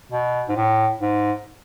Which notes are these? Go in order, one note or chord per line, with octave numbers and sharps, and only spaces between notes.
B2
G#2
A2
G#2